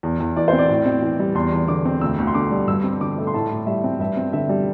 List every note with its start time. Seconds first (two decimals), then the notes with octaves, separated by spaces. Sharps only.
0.03 E2
0.20 E2
0.36 E3 D5
0.48 C5
0.53 C4
0.58 D5
0.69 A2
0.86 C4
1.02 E3
1.19 G3
1.35 E2 C6
1.52 E2
1.68 D3 D6
1.85 C4
2.01 D2 E6
2.18 D2
2.27 C6
2.35 D3 D6
2.51 G3
2.67 G2 E6
2.84 C4
3.01 D3 D6
3.18 A3
3.27 C6
3.34 A2 A5
3.51 A2
3.67 G3 E5
3.84 C4
4.00 G2 E5
4.17 C4
4.33 D3 E5
4.49 G3